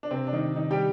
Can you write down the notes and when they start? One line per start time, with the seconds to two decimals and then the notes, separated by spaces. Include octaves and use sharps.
0.03 D4
0.11 C3 C4
0.27 D4
0.33 D#3 D#4
0.55 D#3 D#4
0.71 G3 G4